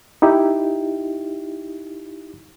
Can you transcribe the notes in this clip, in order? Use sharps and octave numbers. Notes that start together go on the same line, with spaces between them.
D#4 E4 G4